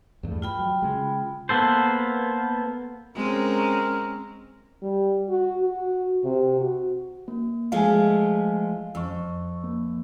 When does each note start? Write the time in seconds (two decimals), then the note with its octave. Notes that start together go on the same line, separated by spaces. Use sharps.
0.23 E2 G2 A3
0.42 F4 G5 B5
0.59 F#3
0.82 C#3 G#3
1.49 A#3 B3 A4 C5
3.16 G#3 C4 C#4 A#4
4.82 G3
5.29 F#4
5.61 F#4
6.25 C3
6.61 F#4
7.28 A#3
7.72 F3 G#3 A3 F5 G#5
8.95 F2 C#6 E6
9.64 A#3